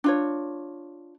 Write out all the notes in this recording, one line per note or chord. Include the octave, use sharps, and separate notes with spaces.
D4 F4 C#5